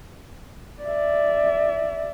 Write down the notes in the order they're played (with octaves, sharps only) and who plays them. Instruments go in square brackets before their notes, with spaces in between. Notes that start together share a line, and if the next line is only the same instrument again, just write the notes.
[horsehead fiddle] D5 E5